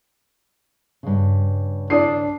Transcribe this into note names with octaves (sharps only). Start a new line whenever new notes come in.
G2 C#3
D4 D5 D#6 C7